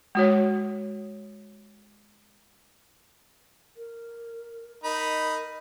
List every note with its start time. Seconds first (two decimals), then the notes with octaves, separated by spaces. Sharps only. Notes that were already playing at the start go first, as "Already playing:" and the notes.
0.15 G#3 F#4 C#5
3.77 A#4
4.84 D#4 A#4 B5